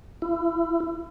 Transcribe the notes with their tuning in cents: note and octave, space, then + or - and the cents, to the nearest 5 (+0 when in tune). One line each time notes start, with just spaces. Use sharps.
E4 +35